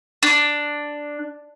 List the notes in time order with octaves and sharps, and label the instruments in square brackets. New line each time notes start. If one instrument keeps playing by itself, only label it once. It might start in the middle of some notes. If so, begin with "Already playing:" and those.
[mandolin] D4